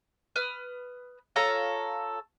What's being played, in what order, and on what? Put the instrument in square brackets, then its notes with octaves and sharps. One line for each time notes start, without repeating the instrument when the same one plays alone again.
[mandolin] B4 D#6 F6
F4 A4 C#5 A#5